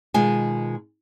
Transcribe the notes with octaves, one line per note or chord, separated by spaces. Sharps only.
B2 D#3 G#3 F4 G#5